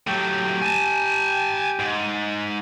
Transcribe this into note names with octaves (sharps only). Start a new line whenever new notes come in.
A2 F#3 G4 G5
G#5 A5
G#2